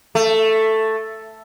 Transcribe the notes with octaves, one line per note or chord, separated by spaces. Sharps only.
A3